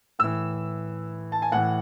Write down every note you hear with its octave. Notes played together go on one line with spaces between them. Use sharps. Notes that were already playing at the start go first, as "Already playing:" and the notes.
A2 E3 E6
A5
G#5
A2 E3 F#5